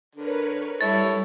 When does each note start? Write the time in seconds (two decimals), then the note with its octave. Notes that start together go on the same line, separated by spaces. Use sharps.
0.15 D3 A#4 B4 C#5
0.81 G3 E4 A4 C#5 A6